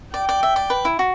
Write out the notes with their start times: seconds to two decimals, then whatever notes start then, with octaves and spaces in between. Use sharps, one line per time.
0.14 D5 G5
0.29 D5
0.43 E5
0.56 D5
0.70 B4
0.85 E4
0.99 F#4